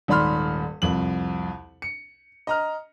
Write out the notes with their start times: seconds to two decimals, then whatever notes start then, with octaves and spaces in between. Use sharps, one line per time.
0.08 D#1 G#2 D5 B5 C6 F6
0.82 C2 F2 F#7
1.82 C#7
2.47 D#5 A#5 F6